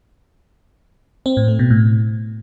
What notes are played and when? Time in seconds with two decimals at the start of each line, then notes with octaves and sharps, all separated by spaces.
1.26 C4
1.37 A2
1.48 A3
1.59 B2
1.70 A2